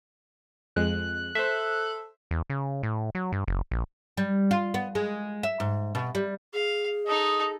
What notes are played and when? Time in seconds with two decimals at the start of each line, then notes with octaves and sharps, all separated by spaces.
0.76 F2 G#3 F#6
1.35 A4 C5 E5
2.31 E2
2.50 C#3
2.83 A2
3.15 F#3
3.32 G2
3.48 F#1
3.71 A#1
4.17 G3
4.51 F4
4.74 B3
4.95 G#3
5.43 E5
5.60 G#2
5.95 B2
6.15 G3
6.54 G#4 F5
7.07 D#4 A4 D#5